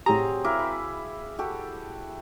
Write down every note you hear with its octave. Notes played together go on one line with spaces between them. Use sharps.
A2 F#3 C4 G4 G#4 A#5
E4 A#4 F5 D6
B5
F#4 G4 A4